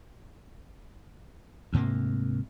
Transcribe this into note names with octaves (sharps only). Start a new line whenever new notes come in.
D2 G#2 C3 A#3